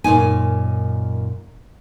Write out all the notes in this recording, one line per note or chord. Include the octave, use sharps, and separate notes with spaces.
F#2 A#2 D#4 G#5